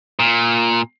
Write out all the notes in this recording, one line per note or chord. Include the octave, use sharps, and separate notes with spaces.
A#2